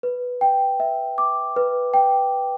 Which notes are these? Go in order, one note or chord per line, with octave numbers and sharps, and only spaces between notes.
B4
G5
E5
D6
B4
G5